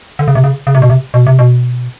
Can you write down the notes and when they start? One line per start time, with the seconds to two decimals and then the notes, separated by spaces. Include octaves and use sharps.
0.19 D3
0.28 C#3
0.35 C3
0.44 C#3
0.67 C#3
0.75 C3
0.82 B2
0.90 C3
1.14 B2
1.27 C3
1.39 B2